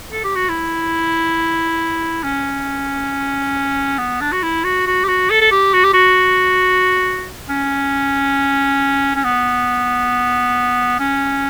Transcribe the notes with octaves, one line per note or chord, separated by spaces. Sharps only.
A4
G4
F#4
E4
C#4
B3
D4
F#4
E4
F#4
F#4
G4
F#4
A4
A4
G4
F#4
G4
F#4
C#4
C#4
B3
C#4